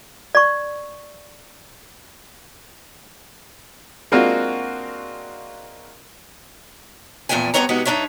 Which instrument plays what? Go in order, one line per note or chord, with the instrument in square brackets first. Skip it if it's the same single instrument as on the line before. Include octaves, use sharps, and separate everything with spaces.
[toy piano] D5 C#6
[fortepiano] G#3 A#3 C4 D4 F4 F#4
[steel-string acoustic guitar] E2 A#2 F3 A3 G5 G#5
G2 G#3 B3 C4 C#5 A#5
C3 G#3 B3 D#4 F#4
G2 D#3 D4 D#4 C#5 E5